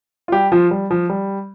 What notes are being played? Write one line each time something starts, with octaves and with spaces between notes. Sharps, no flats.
F4
G3 G4
F3 F4
G3
F3
G3